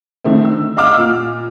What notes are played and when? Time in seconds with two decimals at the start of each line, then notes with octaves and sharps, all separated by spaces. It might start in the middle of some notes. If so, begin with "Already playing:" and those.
0.24 D3 D#3 A3 C4
0.45 E6
0.77 D#5 F5 F#5 D6 E6 F6
0.97 A#2